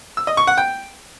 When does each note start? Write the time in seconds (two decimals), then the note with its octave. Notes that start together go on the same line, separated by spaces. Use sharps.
0.17 E6
0.27 D#5
0.37 C#6
0.47 F#5
0.58 G5